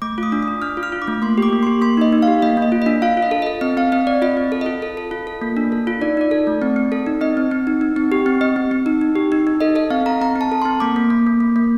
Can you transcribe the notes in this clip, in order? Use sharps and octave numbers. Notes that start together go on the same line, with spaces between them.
A3 D6
F4 D#6
D4
D#6
D4
D4 F6
F4
F6
F4
D6
A3
A#3 C6
G4 D6
A#3
G4 C6
A#3 C6
D#4 D#5
D#4
G4 F5
A#3 D#5
A#3
D#5
F4
D4 D#5
F4 F5
F4
D#5
A4
A4 D#5
C4 D#5
C4 F5
C4 D#5
C4 D5
F4 D#5
C4
A4
F4 D#5
A4
A4
F4
A4
A#3
D4
A4
F4
D#4 D5
D#4 D5
A4
A3
C4
C4
A4
D#4
C4 D#5
C4
C4
D#4
D#4
C4
G4
C4
C4 D#5
C4
C4
D#4
D#4
G4
D#4
D#4
A4 D#5
A4 D#5
C4 F5
A4 A#5
C4 A#5
C4
A5
A4
C4 C6
A#3 D6
A#3
A#3
A#3
A#3
A#3